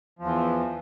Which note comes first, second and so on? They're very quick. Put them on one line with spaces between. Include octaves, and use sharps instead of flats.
F3 E2 E3